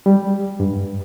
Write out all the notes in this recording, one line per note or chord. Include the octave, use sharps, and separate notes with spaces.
G3
G2